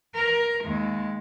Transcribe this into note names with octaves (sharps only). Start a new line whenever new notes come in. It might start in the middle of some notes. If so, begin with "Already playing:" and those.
A#4
D#2 G#3